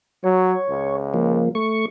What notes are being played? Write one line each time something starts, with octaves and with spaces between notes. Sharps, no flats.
F#3 C#5
C#2
F3 A#3
A3 C#6